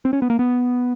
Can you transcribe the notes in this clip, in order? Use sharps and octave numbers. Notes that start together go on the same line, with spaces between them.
C4
C#4
B3
A#3
B3